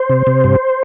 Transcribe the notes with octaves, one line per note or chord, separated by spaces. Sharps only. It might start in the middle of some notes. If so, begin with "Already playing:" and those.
Already playing: C5
C3
C3
G2